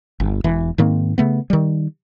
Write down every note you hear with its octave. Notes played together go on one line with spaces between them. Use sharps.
G1
E1 E3
G#2 D#3 A#3 C4
C#3 A3 B3
D#3 G3